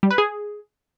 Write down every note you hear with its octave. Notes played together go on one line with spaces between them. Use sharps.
G3
B4
G#4